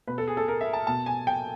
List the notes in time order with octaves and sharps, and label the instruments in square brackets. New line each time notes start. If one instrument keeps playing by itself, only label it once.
[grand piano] B2 B4
A4
G#4
A4
A#4
E5
A5
B2 A5
G#5
G5